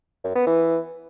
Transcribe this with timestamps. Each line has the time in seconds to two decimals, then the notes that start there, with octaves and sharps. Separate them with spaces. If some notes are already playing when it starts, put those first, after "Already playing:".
0.24 F#2
0.36 B3
0.47 E3